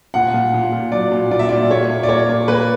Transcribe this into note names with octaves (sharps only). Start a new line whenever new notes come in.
A#2 F#5
A#2
A#2
A#2
F#3 D5
A#2
A#2 D5
E5
A#2 D5
A#3 C#5
A#2
D5
A#3 C#5
A#2
A#3 B4